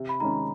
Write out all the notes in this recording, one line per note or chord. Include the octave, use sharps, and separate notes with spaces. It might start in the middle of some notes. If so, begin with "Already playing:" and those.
Already playing: C3
B5
D#3 G#3 C#4 A#5